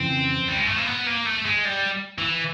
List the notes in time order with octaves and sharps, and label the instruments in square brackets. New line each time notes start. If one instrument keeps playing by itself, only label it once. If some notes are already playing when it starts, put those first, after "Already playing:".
Already playing: [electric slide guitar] F2 C#3 E3 [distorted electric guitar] C4
[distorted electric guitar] G3
G#3
A3
A#3
B3
A#3
A3
G#3
G3
E3